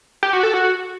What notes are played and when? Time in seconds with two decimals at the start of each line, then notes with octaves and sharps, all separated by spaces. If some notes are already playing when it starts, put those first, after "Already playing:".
0.23 G4
0.33 F#4
0.43 A4
0.54 F#4